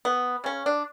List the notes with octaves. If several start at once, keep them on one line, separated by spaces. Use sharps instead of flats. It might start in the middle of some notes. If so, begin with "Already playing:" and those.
B3
C#3 C#4
D4